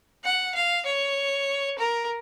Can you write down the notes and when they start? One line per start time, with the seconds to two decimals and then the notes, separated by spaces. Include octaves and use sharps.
0.24 F#5
0.55 F5
0.86 C#5
1.79 A#4